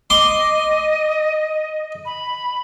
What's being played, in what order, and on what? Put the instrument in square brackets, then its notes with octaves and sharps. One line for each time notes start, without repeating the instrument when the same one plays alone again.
[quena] D#5 [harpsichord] C6 D6
[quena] B5